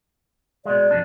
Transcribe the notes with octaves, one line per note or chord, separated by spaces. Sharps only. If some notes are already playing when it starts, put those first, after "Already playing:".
B2 G#3 D5
F2 B2 D4